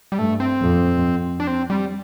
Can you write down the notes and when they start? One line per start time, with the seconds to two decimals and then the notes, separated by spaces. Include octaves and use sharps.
0.12 G3
0.18 G2 A3
0.40 C4
0.62 F2
1.40 D4
1.47 C4
1.70 G3